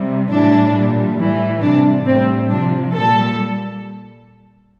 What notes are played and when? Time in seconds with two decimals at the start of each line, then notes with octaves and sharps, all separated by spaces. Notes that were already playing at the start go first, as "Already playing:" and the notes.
Already playing: C3 G3
0.30 A2 E3 G3 D4
0.74 A#2 G3
1.18 A2 E3 G3
1.61 C3 G3 D4
2.05 A2 G3 C4
2.50 C3 F3 D4
2.93 A#2 G3 A4